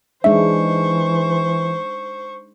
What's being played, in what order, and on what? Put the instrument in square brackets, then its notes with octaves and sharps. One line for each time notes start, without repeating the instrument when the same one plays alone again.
[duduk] E3 [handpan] G#3 D4 D#4 [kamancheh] C5 C#6 [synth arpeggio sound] E5